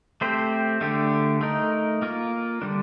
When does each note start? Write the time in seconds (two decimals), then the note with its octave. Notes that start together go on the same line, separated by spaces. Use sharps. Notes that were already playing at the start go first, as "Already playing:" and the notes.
0.21 A3 C4 G4 C5
0.81 D3 A3 D4 G4
1.41 A3 D#4 A#4
2.02 A#3 F4 A#4
2.62 D3 G3 D4